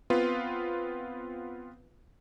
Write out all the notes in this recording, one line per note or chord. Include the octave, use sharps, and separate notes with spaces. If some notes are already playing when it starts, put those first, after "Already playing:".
B3 C4 F4 B4